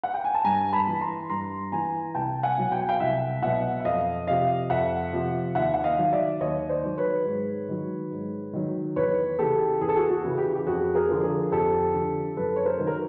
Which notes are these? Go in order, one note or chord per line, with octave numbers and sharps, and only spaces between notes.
F#5
G5
G#5
A5
G2 G#5 A#5
A5 B5
E3
A#5 C6
G2 A#5 C6
E3 G#5 A#5
C2 G5 A5
F#5 G#5
B2 F#3
G5
G#5
F5 G5
C2 E5 F#5
B2 F#3 E5 F#5
E5
F2 D#5 F5
C3 F3 D#5 F5
F2 E5 F#5
C3 F3
D#2 E5 F#5
F#5
D#5 F5
D#3 F#3 F5
D5 E5
D#2 C#5 D#5
C5 D5
D#3 F#3
B4 C#5
G#2
D#3 F#3
G#2
D#3 F#3
E2 B4 C#5
C#3 E3 G4 A4
E2 G#4
A4
F#4 G#4
F#4
C#3 E3
G4
G4
F2 F#4 G#4
G#4 A#4
D3 F3
G#4 A#4
F2 G4 A4
D3 F3
F#2 A4 B4
C#5
A#4 C5
D#3 F#3
A#4